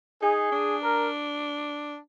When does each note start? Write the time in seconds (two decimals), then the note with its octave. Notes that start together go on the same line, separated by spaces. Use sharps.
0.22 D#4 G#4
0.52 D4
0.82 A#4